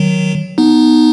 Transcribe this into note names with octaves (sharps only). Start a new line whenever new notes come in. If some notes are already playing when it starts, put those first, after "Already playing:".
Already playing: D#3 F#3
B3 D#4